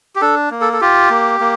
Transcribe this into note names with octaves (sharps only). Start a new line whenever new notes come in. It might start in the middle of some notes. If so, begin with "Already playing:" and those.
G4
D4 A4
A#3
A4
A4
F4 G4
A#3
A#3